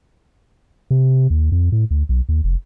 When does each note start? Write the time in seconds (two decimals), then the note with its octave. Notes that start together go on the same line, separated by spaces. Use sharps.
0.91 C3
1.30 D#2
1.52 F2
1.72 A2
1.91 D2
2.09 B1
2.29 D#2
2.44 F1